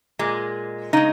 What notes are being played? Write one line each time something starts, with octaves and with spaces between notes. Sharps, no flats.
A#2 G#3
C#3 G#3 D#4